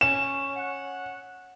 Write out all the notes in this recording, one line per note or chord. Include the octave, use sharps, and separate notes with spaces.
C#4 E7
F#5